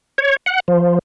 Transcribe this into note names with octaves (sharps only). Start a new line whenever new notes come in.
C#5
F#5
F3